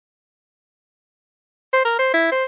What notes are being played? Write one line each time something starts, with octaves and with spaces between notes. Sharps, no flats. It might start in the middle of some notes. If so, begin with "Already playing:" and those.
C5
A#4
C5
E4
C5